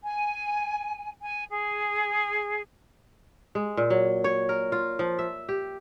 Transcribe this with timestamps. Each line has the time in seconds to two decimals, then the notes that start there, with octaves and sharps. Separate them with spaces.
0.03 G#5
1.22 G#5
1.50 G#4
3.55 G#3
3.77 A#2
3.90 F#3
4.24 C#5
4.49 A#4
4.72 F4
4.99 F3
5.19 E5
5.49 G4